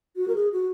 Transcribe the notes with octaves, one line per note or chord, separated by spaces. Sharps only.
F#4
A#4
G#4
F#4